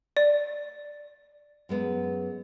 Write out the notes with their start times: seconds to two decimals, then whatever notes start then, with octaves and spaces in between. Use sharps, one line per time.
0.17 D5
1.69 F#2 G#3 B3